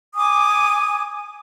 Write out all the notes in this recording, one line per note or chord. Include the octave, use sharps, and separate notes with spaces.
G#5 D6 D#6